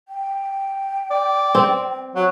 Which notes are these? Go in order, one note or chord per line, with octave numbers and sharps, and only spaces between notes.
G5
D5
C4
F#3